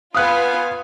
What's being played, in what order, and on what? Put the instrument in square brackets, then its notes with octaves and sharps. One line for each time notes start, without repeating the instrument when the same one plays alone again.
[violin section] B3 F4 [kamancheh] F5 G#5 [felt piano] D#6 F#6